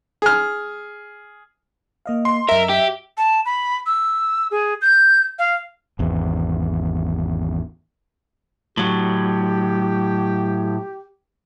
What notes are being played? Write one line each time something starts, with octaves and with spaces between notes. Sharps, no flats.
G#4 F6
A#3 D#5 F5
C6
F#2 A#4 D#5 E5
G4
A5
B5
E6
G#4
G6
F5
G#1 E2
A2 F#3 G4